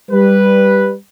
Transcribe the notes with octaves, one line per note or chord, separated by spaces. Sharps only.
G3 B4